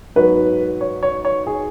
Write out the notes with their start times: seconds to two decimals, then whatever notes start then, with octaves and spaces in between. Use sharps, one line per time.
0.16 G#2 F#3 B3 B4
0.81 C#5
1.03 C#5
1.25 C#5
1.47 G#4